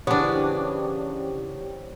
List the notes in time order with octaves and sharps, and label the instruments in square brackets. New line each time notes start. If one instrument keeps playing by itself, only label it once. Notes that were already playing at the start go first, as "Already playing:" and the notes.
[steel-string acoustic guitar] C#3 E3 [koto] B3 D4 [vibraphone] G4 C5 G5 [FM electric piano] C#5